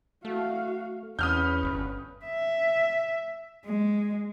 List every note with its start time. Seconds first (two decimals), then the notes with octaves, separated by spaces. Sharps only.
0.25 A3 F#4 F5
1.19 E2 C#4 B4 D#6 F6 G6
1.63 G1
2.26 E5
3.66 G#3